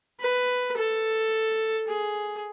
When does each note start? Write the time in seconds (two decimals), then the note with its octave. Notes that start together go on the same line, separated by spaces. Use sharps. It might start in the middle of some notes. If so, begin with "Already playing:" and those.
0.21 B4
0.77 A4
1.88 G#4